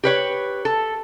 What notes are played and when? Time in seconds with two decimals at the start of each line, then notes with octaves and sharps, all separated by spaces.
0.04 G4 B4 C#5
0.65 A4